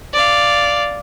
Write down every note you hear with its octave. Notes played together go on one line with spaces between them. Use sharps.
D5 F5